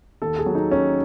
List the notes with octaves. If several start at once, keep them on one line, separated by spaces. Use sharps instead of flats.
D#2 A4
G#4
F#3
D#4
D#3 C#4